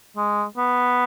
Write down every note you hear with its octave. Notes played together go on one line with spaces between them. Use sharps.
G#3
B3